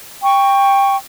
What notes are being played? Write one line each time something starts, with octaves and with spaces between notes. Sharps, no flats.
G5 C#6